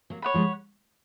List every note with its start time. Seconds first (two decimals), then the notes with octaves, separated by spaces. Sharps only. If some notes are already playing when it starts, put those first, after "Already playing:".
0.10 F#3 A#3
0.22 C#5 F#5 B5
0.34 F3 G#3